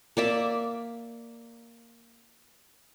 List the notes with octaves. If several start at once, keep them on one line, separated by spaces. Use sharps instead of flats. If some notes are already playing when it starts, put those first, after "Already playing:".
A#3 D5 E5